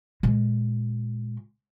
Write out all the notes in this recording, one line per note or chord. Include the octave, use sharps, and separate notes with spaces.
A#2 G#3